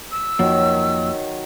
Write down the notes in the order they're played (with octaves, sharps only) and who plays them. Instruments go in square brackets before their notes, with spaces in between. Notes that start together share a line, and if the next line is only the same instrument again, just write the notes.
[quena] E6
[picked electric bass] F2 F3 A#3 [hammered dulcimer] D#3 F#3